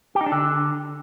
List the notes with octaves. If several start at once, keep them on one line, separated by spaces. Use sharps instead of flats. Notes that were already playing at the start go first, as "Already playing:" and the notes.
G4
D#4
D4
D3